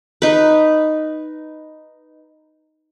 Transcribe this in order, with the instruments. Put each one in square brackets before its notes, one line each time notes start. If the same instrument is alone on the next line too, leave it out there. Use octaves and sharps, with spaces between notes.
[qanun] D#4 B4